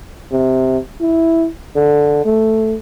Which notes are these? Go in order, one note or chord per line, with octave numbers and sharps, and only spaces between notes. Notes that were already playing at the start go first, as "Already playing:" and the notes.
C3
E4
D3
A3